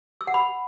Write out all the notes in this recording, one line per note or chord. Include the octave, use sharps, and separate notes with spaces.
E6
F#5
B5